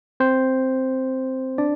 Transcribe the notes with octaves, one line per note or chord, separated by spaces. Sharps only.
C4 C5
D4 D5